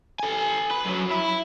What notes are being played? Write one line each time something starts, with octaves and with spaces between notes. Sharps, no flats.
A4 G#5
B4
F#2 F#3
E4